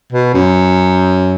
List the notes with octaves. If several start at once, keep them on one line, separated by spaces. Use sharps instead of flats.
B2
F#2